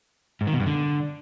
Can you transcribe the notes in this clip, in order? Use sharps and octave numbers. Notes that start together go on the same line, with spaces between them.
G#2
D#3
B2
G2
D3